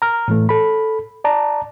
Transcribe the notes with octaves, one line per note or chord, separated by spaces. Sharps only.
A#5 F6
A2 E3 A3
A4 B5
D5 A5 A#5